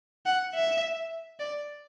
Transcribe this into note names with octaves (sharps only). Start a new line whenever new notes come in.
F#5
E5
D5